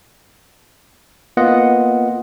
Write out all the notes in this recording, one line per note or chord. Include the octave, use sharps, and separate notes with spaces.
A#3 B3 F4 D#5 F#5